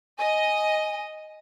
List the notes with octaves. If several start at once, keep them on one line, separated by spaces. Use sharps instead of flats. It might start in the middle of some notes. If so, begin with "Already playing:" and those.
D#5 G#5